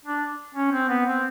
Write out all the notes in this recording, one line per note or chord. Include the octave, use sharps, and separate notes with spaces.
D4
C#4
C4
B3
C4